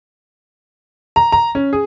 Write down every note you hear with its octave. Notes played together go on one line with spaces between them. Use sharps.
A#5
A#5
C#4
G#4